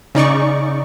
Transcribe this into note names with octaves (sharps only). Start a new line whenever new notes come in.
C#3 D#4 D5 C#6